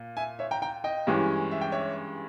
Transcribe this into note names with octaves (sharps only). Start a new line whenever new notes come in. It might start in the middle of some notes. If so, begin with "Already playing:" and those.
Already playing: A#2
E5 G#5
C#5 E5
G5 A#5
G5 A#5
D#5 G5
G2 E3 G#3 C#4 G4
E5
G5
C#5 E5